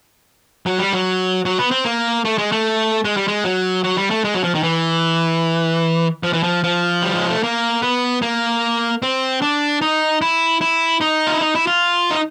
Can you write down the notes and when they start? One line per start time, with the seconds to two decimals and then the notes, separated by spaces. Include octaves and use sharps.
0.66 F#3
0.79 G3
0.93 F#3
1.45 F#3
1.59 B3
1.71 C4
1.85 A#3
2.25 A3
2.38 G#3
2.52 A3
3.05 G#3
3.17 G3
3.28 G#3
3.44 F#3
3.84 F#3
3.97 G3
4.11 A3
4.24 G#3
4.34 F#3
4.44 F3
4.54 D#3
4.63 E3
6.24 F3
6.33 E3
6.43 F3
6.64 F3
7.02 G3
7.15 G#3
7.29 A3
7.43 A#3
7.82 B3
8.22 A#3
9.02 C4
9.42 D4
9.81 D#4
10.22 E4
10.61 E4
11.01 D#4
11.27 F4
11.34 E4
11.41 D#4
11.55 E4
11.67 F4
12.11 D#4